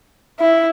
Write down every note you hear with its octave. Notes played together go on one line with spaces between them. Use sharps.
E4